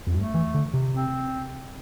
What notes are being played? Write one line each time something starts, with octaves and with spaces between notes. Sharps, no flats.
F2
G2 A3
E3
D3
C3
C4